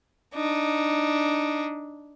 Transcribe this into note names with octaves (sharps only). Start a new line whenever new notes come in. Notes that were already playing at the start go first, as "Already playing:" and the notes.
D4 D#4